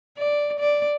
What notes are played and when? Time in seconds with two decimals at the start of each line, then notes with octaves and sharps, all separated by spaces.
0.18 D5
0.59 D5